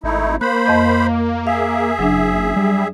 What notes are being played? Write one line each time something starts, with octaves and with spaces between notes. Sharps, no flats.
G#1 A3 D#4 E4
A#3 C5 B5 F#6
F2 D#5 G6
G#4 E5 F5
F#1 F#3 D4
G3